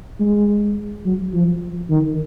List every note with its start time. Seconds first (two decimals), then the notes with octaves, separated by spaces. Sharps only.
0.20 G#3
1.05 F#3
1.34 F3
1.90 D#3